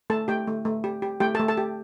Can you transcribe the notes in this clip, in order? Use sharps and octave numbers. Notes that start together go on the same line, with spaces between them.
A3 A4 A5
A3 G4 G5
A3
A3
G4
G4
A3 G4 G5
A4 A5
A3
A4 A5
G4